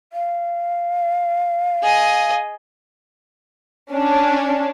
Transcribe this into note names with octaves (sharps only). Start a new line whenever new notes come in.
F5
G#4 D#5
C#4 D4